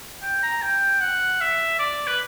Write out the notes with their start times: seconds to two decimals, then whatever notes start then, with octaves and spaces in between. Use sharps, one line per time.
0.22 G5
0.43 A#5
0.62 G5
1.01 F#5
1.41 E5
1.79 D5
2.07 B4